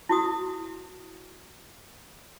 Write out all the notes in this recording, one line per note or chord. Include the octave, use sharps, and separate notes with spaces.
E4 F#4 D#6